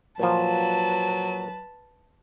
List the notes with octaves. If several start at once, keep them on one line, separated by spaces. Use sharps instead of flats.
A#2 F3 F#3 B4 A5